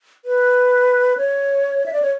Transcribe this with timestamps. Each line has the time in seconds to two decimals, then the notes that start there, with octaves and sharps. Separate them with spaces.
0.25 B4
1.17 C#5
1.86 E5
1.93 D5
2.02 C#5